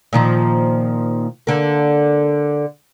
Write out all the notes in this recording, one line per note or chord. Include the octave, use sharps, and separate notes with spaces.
A#2 D#3 F3
D3 A#3